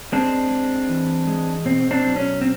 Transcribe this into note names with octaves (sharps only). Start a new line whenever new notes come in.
G#3 C4 D4
G#3
E3
G#3
B2 C4
C4 D4
F#3
C#4
C4